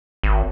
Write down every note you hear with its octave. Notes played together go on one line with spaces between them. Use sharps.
G#1